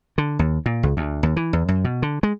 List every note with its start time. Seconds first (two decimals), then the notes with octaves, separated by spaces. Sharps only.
0.18 D3
0.39 D#2
0.66 A#2
0.83 C#2
0.97 D2
1.23 D#2
1.36 E3
1.53 E2
1.68 F#2
1.85 B2
2.02 D3
2.23 G#3